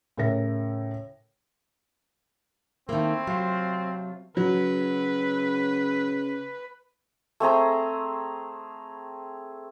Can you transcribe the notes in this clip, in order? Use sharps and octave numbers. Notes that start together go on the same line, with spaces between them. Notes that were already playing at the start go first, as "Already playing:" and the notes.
A2 C#3 A#4 E5 A#6
D#3 A3 A#3 C4 E4
C3 F#3 F4
C#3 F#3 B4
A3 C4 G#4 A#5